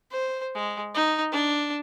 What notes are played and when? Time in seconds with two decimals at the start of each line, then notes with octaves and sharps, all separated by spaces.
0.11 C5
0.55 G#3
0.95 D#4
1.32 D4